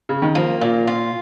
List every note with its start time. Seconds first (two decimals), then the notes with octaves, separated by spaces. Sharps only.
0.09 C#3
0.22 D#3
0.35 F3 A#3
0.61 A#2
0.87 F4